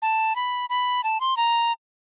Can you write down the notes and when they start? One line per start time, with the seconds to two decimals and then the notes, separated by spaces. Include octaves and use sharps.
0.02 A5
0.36 B5
0.70 B5
1.04 A5
1.21 C6
1.37 A#5